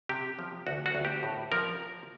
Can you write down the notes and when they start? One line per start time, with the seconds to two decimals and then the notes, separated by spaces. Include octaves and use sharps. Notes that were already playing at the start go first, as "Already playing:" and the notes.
0.09 C3 G4
0.39 F3
0.67 D2 F#4
0.86 F#4
0.95 D2
1.05 G4
1.23 A2
1.52 F3 A#4